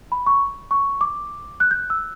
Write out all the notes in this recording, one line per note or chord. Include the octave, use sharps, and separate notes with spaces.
B5
C#6
C#6
D6
F#6
G6
E6